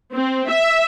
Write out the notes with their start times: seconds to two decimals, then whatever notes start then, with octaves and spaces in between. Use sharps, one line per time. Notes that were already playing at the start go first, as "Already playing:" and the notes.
0.13 C4
0.50 E5